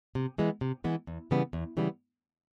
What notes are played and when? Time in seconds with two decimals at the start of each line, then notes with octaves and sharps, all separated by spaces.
0.15 C3
0.38 E3 G#3 B3
0.61 C3
0.84 E3 G#3 B3
1.07 E2
1.31 C#3 E3 G3 B3
1.53 E2
1.77 C#3 E3 G3 B3